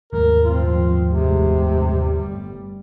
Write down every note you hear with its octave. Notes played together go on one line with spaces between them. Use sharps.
D#2 G#2 A3 A#4
A#2 F3 C4 F4
F1 C3 G#3
G1 A2 G3